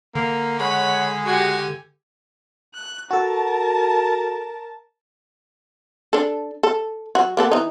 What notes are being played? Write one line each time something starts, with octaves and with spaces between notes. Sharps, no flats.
D3 A#3
G#3 C#5 F#5 B5
F#4 G4 G#5
F#6
F#4 A4 A#4 A5
D4 A4
A4
F#3 F#4
A#3 B3 A4
E3 D#4